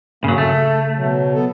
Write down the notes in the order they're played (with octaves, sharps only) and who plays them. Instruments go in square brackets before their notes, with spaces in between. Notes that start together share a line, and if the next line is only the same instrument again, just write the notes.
[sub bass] G2 [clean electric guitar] C#3 F#3 [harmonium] A#3
[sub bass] C#3 [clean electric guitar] A3 [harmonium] A4
[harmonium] B2 F#3
B3 A4